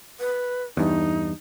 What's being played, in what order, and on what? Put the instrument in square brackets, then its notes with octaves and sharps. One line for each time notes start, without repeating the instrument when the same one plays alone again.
[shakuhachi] B4
[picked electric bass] E2 G2 [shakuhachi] D#4